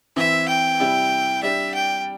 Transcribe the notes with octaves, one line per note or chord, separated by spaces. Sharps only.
E3 C4 E4 E5
G5
C3 G3 E4 G4
G3 D4 G4 E5
G5